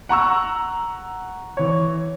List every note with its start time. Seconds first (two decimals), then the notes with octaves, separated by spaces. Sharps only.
0.09 F#5 A#5 C#6 E6
1.57 E3 C#5